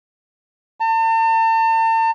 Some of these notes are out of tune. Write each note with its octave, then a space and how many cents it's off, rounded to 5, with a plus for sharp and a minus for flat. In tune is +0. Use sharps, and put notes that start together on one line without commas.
A5 +40